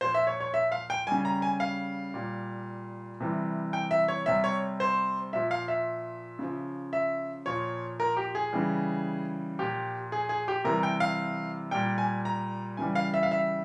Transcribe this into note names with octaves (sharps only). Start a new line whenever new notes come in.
A#2 F3 C5
E5
C#5
C#5
E5
F5
G5
C#3 G3 G#5
A#5
G#5
F5
A#2 G3
C3 E3 G3
G5
E5
C#5
C3 G3 E5
C#5
C5
A#2 F3 E5
F5
E5
C#3 F3
E5
A#2 F3 C#5
A#4
G4
G#4
C#3 E3 G3
A#2 F3 G4
G#4
G#4
G4
C3 E3 G3 A#4
G5
F5
A#2 G3 G5
G#5
A#5
C#3 E3 G3 G#5
F5
E5
F5
E5